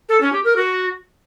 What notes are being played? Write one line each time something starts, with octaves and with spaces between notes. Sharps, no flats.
A4
C#4
G4
A#4
F#4